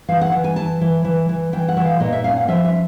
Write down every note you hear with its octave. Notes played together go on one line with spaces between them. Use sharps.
E3 F5
F#5
E3
G#5
E3 A5
E3
E3
E3
E3 G5
F#5
E3
F5
A#2 D#5
E5
C#4 F5
F#5
F3 E5
E5